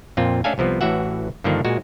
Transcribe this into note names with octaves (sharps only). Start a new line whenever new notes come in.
F2 A#2 C4 F4
A3 C#4 D4 A4 F5 G#5
C2 C3 F3 B3
A1 A2 E3 F#4 E5 F#5
G2 D3 D#3 F3 A#3 D4
A#2 G#3 F#4